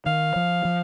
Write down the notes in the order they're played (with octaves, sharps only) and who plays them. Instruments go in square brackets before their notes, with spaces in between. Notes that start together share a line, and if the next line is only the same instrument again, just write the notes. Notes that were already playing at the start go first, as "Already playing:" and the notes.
[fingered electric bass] D#3 [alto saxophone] F5
[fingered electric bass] F3
F3